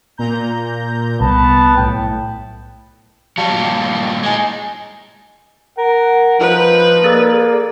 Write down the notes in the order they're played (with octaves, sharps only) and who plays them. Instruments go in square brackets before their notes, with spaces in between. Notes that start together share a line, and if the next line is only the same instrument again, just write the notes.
[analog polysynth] A#2 A#5 G6
[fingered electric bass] C2 [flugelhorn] B3 [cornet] A5
[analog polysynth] B1 A2 [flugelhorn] G5
[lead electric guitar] F#3 G3 [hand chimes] F5 A5
[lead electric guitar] G2 A#2
[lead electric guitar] G#3 D#4 [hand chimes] G#5 G#6
[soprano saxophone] A#4 [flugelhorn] F#5
[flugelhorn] F3 [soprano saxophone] D#4 [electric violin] B4
[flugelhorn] A#3 [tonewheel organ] G#4 A4 D5